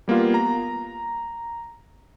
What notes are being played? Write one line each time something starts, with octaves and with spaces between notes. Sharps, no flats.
G3 A#3 B3 F4
A#5